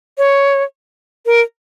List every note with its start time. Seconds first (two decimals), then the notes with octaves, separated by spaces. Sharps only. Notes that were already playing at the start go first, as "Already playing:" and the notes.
0.18 C#5
1.26 A#4